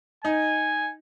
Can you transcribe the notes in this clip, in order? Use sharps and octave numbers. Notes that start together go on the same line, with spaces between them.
D#4 G#5